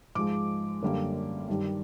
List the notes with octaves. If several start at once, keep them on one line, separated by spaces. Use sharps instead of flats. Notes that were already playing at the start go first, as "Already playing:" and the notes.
G#2 F3 G#3 D6
F#2 D3 G3 A#3
G2 D#3 G3